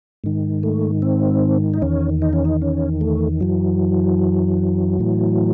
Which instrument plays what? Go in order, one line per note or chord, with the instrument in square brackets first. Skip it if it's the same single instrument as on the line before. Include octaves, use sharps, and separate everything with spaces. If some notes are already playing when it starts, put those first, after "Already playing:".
[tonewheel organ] G#2 D#3
A3
C4
D#4
E2 D#3 C#4
D#4
C#4
D#4
C#4
A3
F#2 E3 F#3
A2 E3